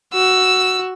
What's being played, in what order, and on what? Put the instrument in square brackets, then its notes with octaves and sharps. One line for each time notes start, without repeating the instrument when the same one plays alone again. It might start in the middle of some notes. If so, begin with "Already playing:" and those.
[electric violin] F#4 [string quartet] E6